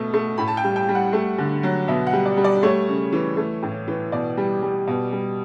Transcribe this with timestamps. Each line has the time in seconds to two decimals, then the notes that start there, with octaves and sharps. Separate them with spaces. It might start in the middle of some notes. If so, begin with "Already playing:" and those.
Already playing: B2 A3
0.14 A3
0.38 A2 B5
0.48 A5
0.57 G5
0.64 G3
0.76 G5
0.89 G3
0.95 F#5
1.13 A3
1.38 D3
1.63 F#3
1.88 B2 E5
2.07 F#5
2.13 G3
2.26 D5
2.37 G3
2.44 D5
2.63 A3 C#5
2.88 C#3
3.12 E3
3.37 A3
3.63 A2
3.88 E3
4.12 B2 D5
4.37 G3
4.62 G3
4.87 B2
5.12 G3